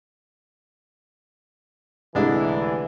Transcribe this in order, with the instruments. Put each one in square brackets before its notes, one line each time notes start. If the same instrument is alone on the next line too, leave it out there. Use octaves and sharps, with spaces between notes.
[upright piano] C2 A3 [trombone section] D3 E3 [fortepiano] G#3 D4 E4